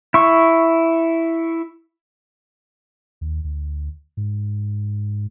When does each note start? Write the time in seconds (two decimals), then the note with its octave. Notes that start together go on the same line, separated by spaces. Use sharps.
0.14 E4 C#6
3.21 D#2
3.44 D2
4.17 G#2